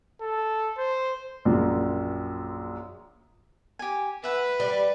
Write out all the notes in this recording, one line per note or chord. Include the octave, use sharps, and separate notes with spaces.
A4
C5
A#1 F#2
G4 G#5
B4 E5 F#5
G3